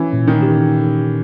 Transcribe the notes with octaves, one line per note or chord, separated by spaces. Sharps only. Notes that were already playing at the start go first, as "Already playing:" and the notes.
Already playing: E3 C#4
A#2
D#3
G4